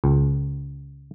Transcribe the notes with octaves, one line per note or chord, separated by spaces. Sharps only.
C#2